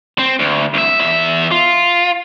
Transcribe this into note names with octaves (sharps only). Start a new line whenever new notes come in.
C4
D2
C2 E5
E2 E5
F4